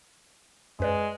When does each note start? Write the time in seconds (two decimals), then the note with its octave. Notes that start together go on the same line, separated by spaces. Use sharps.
0.80 F#2 G#3 B4 D5